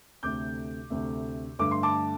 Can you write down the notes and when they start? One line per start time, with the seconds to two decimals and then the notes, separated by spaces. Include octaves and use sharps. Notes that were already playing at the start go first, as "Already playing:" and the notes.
0.23 D2 C3 A3 D6 G6
0.90 D2 C3 A3
1.59 G2 D3 A3 D6
1.71 C6
1.83 A5 D6